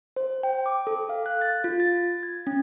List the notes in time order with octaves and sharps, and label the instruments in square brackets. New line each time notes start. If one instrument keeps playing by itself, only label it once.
[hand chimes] C5
G5
D6
A4
F5
F#6
A6
F4
A6
G#6
C#4